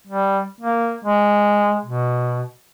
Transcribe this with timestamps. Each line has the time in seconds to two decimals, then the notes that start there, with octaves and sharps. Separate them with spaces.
0.07 G3
0.61 A#3
1.05 G#3
1.85 B2